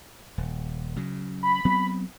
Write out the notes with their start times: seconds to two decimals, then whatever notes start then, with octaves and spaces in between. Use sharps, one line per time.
0.38 D#1
0.96 C#3 F#3
1.43 B5
1.65 F#3 B3 C4